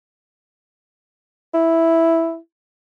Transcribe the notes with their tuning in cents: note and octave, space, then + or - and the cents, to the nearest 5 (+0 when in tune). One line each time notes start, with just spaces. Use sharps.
E4 +0